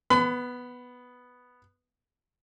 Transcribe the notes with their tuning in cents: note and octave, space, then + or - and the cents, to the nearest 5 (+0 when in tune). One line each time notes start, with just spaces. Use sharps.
B3 +0 B5 +35